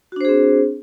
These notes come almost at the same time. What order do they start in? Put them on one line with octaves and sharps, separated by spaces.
F#4 D4 C5 G#4 C4